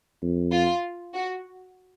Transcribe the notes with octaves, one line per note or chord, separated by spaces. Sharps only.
F2
F4
F#4